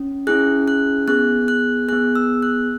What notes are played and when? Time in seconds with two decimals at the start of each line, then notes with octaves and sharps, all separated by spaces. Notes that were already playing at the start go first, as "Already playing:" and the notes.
Already playing: C#4
0.27 C#4 E4 G#4 F#6
0.68 F#6
1.08 B3 G#4 F#6
1.48 F#6
1.88 B3 G#4 F#6
2.15 E6
2.43 F#6